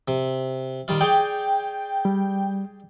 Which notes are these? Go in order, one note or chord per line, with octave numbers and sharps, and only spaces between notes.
C3
D#3 G3 F4
G#4 C#5 D5 G5
G3